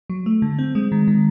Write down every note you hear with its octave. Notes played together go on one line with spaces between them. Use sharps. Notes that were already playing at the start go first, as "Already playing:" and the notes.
F#3
A3
D3
C4
G#3
D#3
D#3